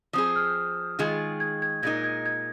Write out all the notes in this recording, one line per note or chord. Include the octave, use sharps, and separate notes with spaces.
F3 C4 G#4 D#6
F6
D#3 G#3 F4 G#4
G#6
G#6
A#2 G#3 D#4 A#4 G#6
G#6
G#6